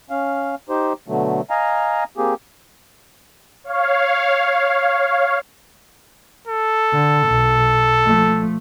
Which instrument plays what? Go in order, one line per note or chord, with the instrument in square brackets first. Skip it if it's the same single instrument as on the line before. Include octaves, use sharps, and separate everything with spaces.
[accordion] C#4 F5
D#4 G4 C5
B2 D3 F#3 A3
D#5 F5 G#5 A#5
A#3 C4 G4 G#4
[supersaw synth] C#5 F5
[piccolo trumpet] A4
[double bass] D3
B1
F3 A3